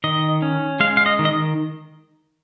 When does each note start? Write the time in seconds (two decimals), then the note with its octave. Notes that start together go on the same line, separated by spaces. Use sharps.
0.04 D#3 D#5
0.42 C#4
0.80 G#3 F5
0.97 F5
1.06 D#5
1.19 D#3
1.25 D#5